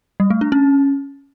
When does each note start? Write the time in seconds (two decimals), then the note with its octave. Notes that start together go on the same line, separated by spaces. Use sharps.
0.20 G3
0.30 A3
0.41 D4
0.52 C#4